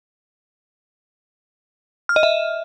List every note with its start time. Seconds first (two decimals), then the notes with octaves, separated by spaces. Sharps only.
2.09 F6
2.16 D#5
2.23 E5